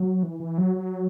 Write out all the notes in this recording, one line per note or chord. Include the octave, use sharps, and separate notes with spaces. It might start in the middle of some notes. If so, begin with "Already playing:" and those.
Already playing: F#3
E3
E3
F#3
F#3